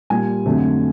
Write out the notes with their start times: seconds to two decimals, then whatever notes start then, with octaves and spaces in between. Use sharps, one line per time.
0.10 A#2 G3 G#5
0.45 F2 D3 F#3 A3